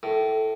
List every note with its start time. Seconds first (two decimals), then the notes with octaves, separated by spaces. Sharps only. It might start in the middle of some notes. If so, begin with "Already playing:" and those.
0.03 A2